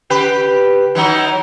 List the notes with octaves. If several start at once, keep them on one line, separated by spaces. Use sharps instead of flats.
C#3 G4 B4
E3 F#3 D#4